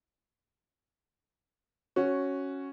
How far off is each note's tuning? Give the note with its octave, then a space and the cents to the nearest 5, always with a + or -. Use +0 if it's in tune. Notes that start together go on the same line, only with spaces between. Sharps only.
C#4 -5 F#4 +0